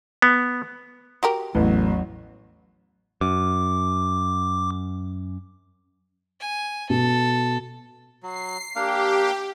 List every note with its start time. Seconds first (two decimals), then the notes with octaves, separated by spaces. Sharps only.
0.22 B3
1.23 F#4 G4 A#4
1.55 A1 E2 F#3
3.21 F#2 D6
6.40 G#5
6.90 B2 A4
8.23 F#3 C7
8.76 A#3 D4 G4 F5